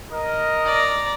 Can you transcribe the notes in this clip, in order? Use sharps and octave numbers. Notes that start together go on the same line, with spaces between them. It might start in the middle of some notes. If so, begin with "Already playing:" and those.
A#4 D#5
D5 A#5